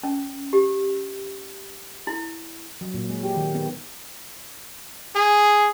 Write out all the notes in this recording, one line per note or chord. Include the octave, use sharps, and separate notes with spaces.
C#4
G4
E4
F#3
A#2
G#3
G4
D#3
B3
G#4